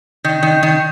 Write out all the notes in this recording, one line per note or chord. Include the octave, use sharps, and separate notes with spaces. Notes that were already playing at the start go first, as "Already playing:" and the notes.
D#3
D#3
D#3